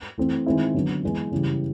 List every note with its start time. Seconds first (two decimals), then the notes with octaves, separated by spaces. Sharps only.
0.18 E3 A3 C4
0.46 D#3 G#3 C4 E4
0.75 D3 F#3 B3
1.03 E3 G#3 B3
1.31 C#3 E3 G3